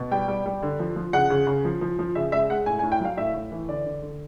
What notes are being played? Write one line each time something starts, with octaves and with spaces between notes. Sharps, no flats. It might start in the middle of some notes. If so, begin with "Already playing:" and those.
Already playing: B2
G3 G5
G3
G3
D3
F3
F3
C#3 F#5
C#3
C#3
F3
F3
F3
C#3 E5
G#3 E5
G#3 F#5
A2 G#5
G#5
A2
G5
F#3 F5
A2 E5
A2
E3
D3 D5
D3
D3